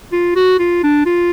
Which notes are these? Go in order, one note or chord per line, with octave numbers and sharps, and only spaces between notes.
F4
F#4
F4
D4
F4